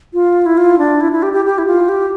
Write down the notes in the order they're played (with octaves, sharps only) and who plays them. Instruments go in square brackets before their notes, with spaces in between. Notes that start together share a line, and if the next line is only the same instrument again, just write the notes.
[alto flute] F4
E4
F4
D4
E4
E4
G4
G4
G4
E4
F4
G4